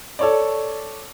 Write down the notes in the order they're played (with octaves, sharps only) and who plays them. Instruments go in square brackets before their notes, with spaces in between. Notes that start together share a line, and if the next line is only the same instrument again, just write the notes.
[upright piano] A4 C#5 D5